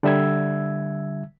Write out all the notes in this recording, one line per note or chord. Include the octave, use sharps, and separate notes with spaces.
D3 G3 E5 E6 G#6